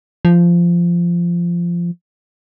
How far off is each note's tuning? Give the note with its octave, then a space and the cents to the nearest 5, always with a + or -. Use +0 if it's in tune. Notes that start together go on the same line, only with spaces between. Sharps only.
F3 -15